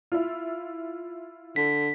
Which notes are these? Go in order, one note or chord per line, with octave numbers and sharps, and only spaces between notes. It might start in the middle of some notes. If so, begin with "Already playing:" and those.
E4 F4
D3 B6